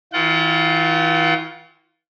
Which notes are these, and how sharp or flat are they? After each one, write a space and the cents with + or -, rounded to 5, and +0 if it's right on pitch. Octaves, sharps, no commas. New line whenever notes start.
E3 -35 F4 +5 F#5 +45